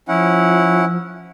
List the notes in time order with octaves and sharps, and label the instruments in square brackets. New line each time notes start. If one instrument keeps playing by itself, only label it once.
[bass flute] F3 [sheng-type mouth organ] C#4 E4 F#5